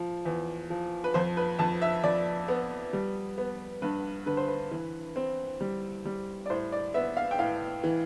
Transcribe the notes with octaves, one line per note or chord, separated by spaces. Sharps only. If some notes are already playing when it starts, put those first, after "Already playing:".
Already playing: F3
E2
F3
B4
F2 C5
B4
F2 A5
E5
F2 D5
B3
G3
B3
G2 B4
D3 B4
C5
B4
E3
C4
G3
G3
D5
A2 C5
D5
B3 E5
F5
G5
A2 F5
E3